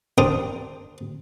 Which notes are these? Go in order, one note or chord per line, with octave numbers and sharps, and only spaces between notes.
C3 D4 A#4 C5 G5 D#6